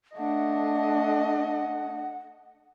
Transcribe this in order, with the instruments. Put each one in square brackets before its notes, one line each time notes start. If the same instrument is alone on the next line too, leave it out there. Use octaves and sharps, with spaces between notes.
[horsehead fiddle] A3 D4 [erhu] D#5 [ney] F#5